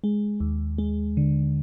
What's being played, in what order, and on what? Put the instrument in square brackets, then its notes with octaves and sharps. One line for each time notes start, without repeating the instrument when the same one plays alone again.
[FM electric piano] G#3
D#2
G#3
D3